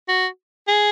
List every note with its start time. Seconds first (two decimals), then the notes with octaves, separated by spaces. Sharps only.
0.08 F#4
0.68 G#4